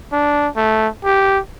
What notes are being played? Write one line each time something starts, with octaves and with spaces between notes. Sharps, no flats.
D4
A3
G4